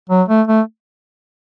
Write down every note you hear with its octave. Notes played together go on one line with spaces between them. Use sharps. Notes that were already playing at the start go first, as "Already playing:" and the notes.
F#3
A3
A3